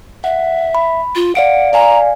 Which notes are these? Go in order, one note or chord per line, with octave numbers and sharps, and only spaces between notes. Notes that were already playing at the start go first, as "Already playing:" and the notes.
E5 F#5
B5
F4
D5 F5 F#5 D7
D5 F5 G#5 A#5